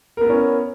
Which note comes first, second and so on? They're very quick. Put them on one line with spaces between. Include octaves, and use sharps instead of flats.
A#4 B3 E4 C#4